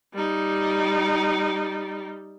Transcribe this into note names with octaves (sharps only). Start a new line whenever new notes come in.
G3 D#4